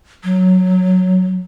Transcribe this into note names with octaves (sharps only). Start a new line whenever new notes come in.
F#3